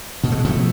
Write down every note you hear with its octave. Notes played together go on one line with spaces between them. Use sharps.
B2 B3
A3
G#3
B2 F3 A3